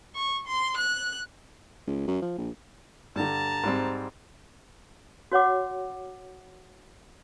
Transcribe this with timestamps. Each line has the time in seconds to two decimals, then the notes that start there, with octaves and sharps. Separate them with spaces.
0.15 C#6
0.47 C6
0.78 F#6
1.87 C#2
2.07 F#2
2.22 F3
2.38 A#1
3.16 G2 D3 A5 A#5
3.64 G#2 G3 C4
5.32 F#4 C#5 F#5 D6